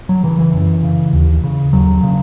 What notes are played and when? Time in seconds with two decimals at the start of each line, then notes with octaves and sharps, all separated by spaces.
0.09 F#3
0.23 C#3 E3
0.39 E3
0.54 F#2
0.83 C#3
1.13 D#2
1.44 C#3
1.73 D#2 F#3
2.03 C#3